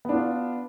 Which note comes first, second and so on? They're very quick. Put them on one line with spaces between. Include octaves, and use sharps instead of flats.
B3 D4 F4